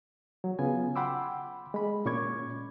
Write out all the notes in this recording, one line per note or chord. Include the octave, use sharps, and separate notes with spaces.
F#3
C#3 B3 F4 G#5
F#5 G5 B5 C6 D6 E6
G#3 B5
A#2 C#4 C#6 D6 G#6